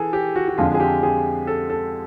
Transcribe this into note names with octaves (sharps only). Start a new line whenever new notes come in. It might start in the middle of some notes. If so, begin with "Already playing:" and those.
Already playing: E3 G#4 A4
G4
F#4
F#4
F2 D3 F3 G#3 F4
G#4
G4
G#4
A4
A4